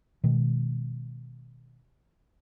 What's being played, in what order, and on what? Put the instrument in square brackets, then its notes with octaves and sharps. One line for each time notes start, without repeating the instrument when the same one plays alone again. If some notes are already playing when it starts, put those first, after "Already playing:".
[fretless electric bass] B2 D#3 G#3